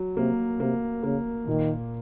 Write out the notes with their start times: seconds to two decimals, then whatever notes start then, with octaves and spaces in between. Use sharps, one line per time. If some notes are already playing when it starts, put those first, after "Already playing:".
Already playing: F#3
0.17 C3 A#3
0.60 C3 A#3
1.04 C#3 A#3
1.47 A#2 D#3